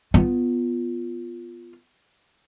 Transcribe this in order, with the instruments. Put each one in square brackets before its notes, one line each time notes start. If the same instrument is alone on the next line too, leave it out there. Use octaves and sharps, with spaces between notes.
[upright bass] B3 F4